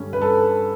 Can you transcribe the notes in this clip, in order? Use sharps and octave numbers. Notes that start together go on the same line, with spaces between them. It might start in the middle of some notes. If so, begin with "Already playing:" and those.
Already playing: G2 D3 G3 C#4
B4
A4